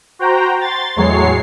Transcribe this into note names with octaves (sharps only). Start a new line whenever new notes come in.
F#4 C5 G5 A#5
C6 A6
E2 A2 F#3 G#3 C#5 C7